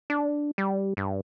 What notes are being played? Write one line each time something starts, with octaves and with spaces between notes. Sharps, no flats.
D4
G3
G2